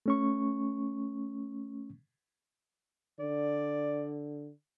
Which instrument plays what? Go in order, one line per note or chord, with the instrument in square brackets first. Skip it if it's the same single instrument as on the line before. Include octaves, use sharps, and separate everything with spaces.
[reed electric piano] A3 C#4 C#6
[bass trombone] D3 [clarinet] D5